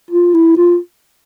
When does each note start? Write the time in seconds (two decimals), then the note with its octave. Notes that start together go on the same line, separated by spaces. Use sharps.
0.11 F4
0.34 E4
0.57 F4